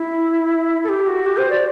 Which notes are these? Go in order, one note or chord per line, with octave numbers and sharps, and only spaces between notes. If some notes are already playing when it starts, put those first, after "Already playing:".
Already playing: E4
A4
G4
F#4
G4
C5
D5